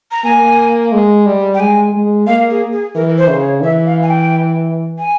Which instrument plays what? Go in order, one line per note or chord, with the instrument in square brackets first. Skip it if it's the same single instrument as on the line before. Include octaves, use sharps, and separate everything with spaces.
[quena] A#5
[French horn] A#3 [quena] G#5
[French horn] G#3
G3
[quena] G5
[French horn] G#3 [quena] G#5
[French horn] G#3
[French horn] A#3 [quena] F5
[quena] G#4
G#4
[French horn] E3 [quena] A#4
[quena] C5
[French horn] C#3
[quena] C#5
[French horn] E3 [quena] E5
[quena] F5
G#5
G5
G#5